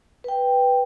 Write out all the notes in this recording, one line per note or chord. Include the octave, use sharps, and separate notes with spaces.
B4 G5